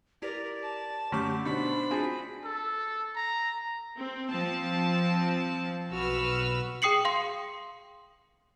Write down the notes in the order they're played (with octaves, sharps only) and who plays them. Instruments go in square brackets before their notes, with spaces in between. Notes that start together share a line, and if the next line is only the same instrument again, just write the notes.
[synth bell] E4 G4 [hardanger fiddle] A#4 [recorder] D5
[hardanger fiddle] A5
[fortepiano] F#2 [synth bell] D3 A3 D6 [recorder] G4
[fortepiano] B2 [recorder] D4 [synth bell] D#4 [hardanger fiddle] C5 B5
[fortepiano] C4 G#4 [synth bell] F4 F#4
[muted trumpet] A4
A#5
[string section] C4
F3 C4 A5
B1 F#4 B4 E6 F6
[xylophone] G#4 G5 D#6 C7 C#7 F#7
F5 C6